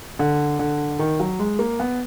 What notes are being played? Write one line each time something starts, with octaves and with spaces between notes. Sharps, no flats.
D3
D3
D#3
F#3
G#3
A#3
B3